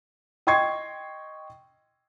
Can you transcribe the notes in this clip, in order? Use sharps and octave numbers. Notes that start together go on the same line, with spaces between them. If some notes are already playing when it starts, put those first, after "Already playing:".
D#5 G5 C6 C#6 G#6 C7